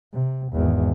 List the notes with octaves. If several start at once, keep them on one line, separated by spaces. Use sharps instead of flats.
C3
G#1 E2